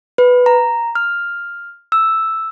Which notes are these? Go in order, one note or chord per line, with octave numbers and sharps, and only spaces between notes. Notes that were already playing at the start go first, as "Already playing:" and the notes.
B4
A#5
F6
E6